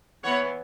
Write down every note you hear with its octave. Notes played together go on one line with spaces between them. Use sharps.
E3 B3 C#5 F#5